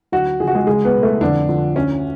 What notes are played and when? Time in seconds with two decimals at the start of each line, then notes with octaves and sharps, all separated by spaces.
0.12 D2 F#3 F#4
0.40 C#3 F3 G#4
0.48 F#4
0.55 G#3 G#4
0.67 C#2 G#3 G#4
0.85 B3 B4
0.94 B2
1.03 A3 A4
1.21 F2 D3 D4
1.49 D3 F3
1.75 D2 C#4